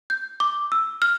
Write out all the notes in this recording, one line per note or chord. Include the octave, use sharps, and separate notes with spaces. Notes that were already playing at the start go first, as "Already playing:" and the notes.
G6
D6
E6
F6